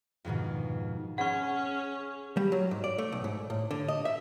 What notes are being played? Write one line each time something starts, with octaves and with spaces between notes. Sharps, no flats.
F2 G#2 B2 D#3
C#4 G#4 F#5 C#6
G3
F#3
G#2
D5
A3
B1
G#2
A2
D3
D#5
E5